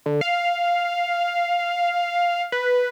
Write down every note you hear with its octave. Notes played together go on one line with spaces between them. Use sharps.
D3
F5
B4